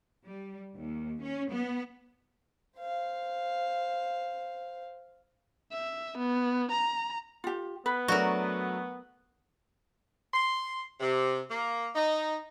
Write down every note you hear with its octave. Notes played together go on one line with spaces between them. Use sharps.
G3
D#2
C#4
B3
C5 F5
E5
B3
A#5
F4 G4
B3 B4
F#3 A3 D4 F#4 A#4
C6
C3
A#3
D#4